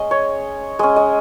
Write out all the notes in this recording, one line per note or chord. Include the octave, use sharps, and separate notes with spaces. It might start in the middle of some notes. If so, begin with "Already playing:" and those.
Already playing: G#3 C#4 D#5
C#5
G#3 C#4 D#5
D#5